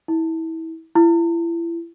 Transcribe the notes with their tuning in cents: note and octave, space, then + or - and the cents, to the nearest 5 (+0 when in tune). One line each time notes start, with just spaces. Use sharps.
E4 -25
E4 +30